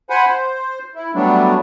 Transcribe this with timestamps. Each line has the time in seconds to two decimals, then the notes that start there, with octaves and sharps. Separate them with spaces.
0.10 C5 F#5 G#5 B5
0.27 C5
0.95 E4
1.15 F#3 G3 A3 B3 D4